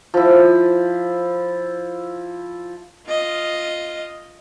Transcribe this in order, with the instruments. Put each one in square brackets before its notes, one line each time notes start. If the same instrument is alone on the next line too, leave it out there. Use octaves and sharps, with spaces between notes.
[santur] F3 E4
[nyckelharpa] F4 D#5